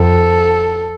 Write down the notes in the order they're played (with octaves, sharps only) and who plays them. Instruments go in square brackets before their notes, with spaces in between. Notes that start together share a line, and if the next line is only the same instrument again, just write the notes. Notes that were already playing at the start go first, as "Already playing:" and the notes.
Already playing: [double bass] F2 [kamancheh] A4